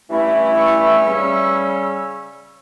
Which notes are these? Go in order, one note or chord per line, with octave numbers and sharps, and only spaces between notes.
G2 E3 A3 C#4 E4
C#6 E6
C#3 G3 C#4